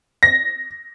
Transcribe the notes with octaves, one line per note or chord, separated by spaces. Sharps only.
A#6